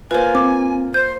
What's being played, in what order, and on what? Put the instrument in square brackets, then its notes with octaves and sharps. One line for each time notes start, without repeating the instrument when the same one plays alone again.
[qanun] A#3 F4 [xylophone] B4 C5 [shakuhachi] G#5
[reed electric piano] C4 [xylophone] D6
[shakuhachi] C5 [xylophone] G6